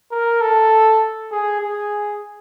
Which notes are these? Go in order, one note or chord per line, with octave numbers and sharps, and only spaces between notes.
A#4
A4
G#4
G#4